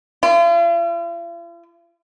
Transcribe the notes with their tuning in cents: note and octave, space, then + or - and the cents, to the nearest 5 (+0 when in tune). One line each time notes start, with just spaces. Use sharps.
F4 -45